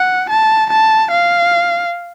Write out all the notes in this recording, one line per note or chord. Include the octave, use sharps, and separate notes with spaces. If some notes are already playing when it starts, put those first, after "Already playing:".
Already playing: F#5
A5
A5
F5